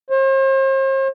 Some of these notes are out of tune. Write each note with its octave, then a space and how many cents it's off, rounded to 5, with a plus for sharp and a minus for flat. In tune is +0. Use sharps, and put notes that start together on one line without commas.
C5 +45